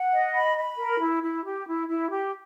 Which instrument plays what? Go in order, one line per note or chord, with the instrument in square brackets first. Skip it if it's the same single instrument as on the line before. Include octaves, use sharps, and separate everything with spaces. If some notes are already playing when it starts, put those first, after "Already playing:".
Already playing: [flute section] F#5
D#5
B5
B5
A#4
E4
E4
G4
E4
E4
G4